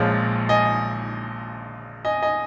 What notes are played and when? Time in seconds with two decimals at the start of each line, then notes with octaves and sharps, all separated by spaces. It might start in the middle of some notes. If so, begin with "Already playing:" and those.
Already playing: A#1 A#2 F3 G#3 C#5 F5
0.49 D#5 G#5
2.05 D#5 G#5
2.22 D#5 G#5